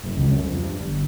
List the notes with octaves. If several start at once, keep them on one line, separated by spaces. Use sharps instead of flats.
F#1
C#2
F#2
F2
G2
G1